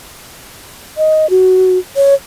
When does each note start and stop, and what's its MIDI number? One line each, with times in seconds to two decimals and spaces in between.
0.97 1.29 75
1.30 1.78 66
1.96 2.14 73